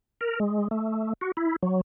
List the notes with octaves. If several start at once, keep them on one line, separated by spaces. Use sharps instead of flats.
A#4
G#3
A3
F#4
E4
F#3